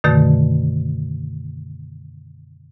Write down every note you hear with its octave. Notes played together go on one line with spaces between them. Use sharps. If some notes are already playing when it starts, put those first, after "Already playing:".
F#2 B2 D3 D#3 A3